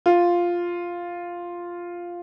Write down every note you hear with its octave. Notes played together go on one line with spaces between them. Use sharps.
F4